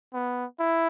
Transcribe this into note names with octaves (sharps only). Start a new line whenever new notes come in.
B3
E4